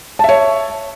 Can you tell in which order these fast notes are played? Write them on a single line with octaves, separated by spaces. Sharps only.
A5 E5 C#5